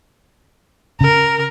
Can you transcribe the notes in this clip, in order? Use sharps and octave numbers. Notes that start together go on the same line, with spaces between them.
C#3 A#4